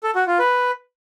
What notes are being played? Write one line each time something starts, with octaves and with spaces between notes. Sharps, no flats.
A4
F#4
F4
B4